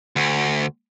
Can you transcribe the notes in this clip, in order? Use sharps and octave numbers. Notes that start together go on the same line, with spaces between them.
D2